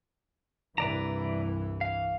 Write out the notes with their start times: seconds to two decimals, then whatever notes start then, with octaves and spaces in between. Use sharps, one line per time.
0.78 C2 G2 E3 B4 D5 A#5
1.81 F5